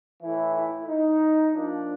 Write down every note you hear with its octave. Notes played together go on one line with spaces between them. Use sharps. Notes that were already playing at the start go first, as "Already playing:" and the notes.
A2 E3 E4
E4
D#4
A#2 F3 D4